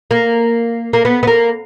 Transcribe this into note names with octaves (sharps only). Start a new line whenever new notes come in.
A#3
A#3
B3
B3
A#3